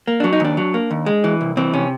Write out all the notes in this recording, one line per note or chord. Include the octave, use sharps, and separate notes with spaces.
A#3
F#3 D4
D#4
D#2 D4
F#3
A#3
D#2
G#3
E3
C2
E3 C4
C3 C#4